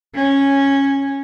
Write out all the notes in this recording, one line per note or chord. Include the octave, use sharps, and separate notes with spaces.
C#4